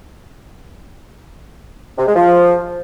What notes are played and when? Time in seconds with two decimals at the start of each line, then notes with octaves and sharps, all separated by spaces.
1.98 C3
2.07 G#3
2.16 F3